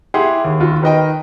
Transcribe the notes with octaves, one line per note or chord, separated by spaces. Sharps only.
E4 G4 G#4 F#5 C6
D#2
D#2 F4 F#4
D#3 B4 D#5 G5